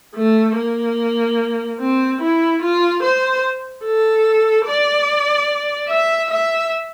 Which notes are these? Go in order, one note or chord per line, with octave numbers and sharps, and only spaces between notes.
A3
A#3
C4
E4
F4
C5
A4
D5
E5
E5